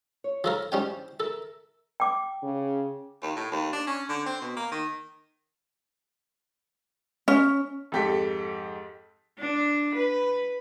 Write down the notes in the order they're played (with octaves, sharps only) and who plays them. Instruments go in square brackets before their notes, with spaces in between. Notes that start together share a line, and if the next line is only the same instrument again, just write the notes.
[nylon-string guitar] C#5
[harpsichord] F3 A4 A#4
[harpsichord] G3 C#4 G5 [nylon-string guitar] E4 C5
[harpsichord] A4 [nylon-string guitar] A#4 E5
[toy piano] G5 D6
[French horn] C#3
[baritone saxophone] D#2
A2
D#2
D4
C#4
D3
C4
B2
A#3
D#3
[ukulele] C#4
[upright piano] F2 G#2 G4 A4 B6
[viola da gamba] D4
B4